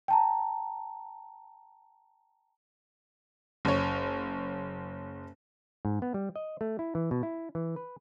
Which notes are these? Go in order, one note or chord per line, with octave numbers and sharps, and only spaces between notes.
G5 A5 A#5
F#1 C#5
G#2
B3
G3
D#5
A3
E4
E3
B2
E4
E3
B4